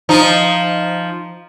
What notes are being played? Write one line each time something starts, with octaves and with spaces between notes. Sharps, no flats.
F3 D#4